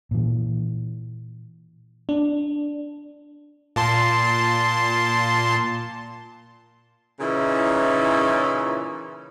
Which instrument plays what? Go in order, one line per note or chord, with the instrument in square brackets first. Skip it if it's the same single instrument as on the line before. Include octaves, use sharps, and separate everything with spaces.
[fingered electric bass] A#2 E3
[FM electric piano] D4
[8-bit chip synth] A#2 A5 C6
[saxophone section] A#2 C#3 E3 C#4 D#4 E4